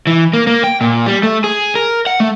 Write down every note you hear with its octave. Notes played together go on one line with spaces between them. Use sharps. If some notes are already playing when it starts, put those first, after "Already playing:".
E3
A#3
A#3
G5
A#2
G3
A3
G#4
A#4
F#5
A3